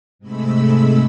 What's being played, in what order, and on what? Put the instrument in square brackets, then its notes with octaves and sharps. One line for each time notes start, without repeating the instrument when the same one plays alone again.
[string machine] G#2 C3 G#3 A3 B5 E6